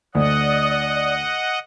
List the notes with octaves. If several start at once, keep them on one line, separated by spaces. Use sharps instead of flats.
D2 D5 D#5 F#5 D#6